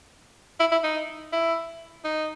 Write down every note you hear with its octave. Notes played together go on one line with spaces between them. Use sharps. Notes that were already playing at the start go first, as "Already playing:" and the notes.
E4
E4
D#4
E4
D#4